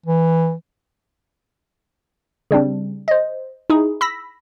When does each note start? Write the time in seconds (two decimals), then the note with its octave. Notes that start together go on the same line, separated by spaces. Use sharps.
0.06 E3
2.51 C#3 G3 C4 D4
3.08 C5 D#5
3.70 D#4 E4 G#4
4.01 B5 E6 A#6 B6